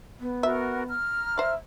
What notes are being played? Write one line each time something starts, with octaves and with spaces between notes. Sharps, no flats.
B3
F#4 A#4 E5
A#5 F6
C5 D5 E5